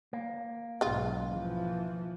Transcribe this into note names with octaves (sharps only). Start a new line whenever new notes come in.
A#3
B1 G#2 C#3 F4
E3 F3